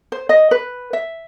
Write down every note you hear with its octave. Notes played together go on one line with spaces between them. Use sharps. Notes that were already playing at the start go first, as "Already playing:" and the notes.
C5
D#5
B4
E5